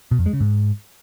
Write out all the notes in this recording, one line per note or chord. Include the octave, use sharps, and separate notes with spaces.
B2
F2
G#3
C#3
G#2